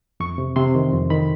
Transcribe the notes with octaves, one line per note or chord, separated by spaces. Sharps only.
F2 C#6
C3
C3 C6
D#3
F2
D#3 B5